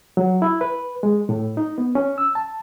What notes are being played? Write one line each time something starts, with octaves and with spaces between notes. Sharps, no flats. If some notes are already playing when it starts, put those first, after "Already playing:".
F#3
E4
B4
G#3
A2
D#4
B3
C#4
E6
A5